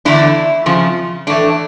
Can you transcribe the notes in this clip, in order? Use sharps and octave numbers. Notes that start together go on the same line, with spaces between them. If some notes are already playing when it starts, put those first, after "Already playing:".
E2 D3 A3 D4 E4
F2 C#3 F3
A2 E3 A3 D4